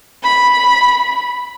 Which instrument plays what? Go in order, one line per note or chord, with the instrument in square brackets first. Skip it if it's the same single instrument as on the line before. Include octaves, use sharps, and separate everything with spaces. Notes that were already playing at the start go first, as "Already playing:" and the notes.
[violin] B5